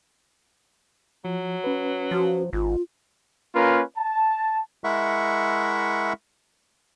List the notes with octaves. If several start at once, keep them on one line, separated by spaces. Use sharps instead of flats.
F3 F#3
C#4 B4
F3 F#4
G#1 F4
A#3 C#4 F4 A#4 B4
A5
G#3 E4 A#4 E5 F#5 C#6